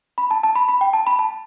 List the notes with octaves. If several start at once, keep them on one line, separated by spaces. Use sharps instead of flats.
B5
A5
A5
B5
B5
G5
A5
B5
A5